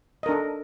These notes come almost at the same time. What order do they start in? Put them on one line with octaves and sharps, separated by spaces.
D#5 A#4 D4 A4